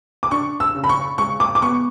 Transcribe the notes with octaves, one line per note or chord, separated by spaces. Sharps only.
D6
D4 C#6
E6
C#3
B5
C#6
G#3 C#6
D6
D6
B3 C#6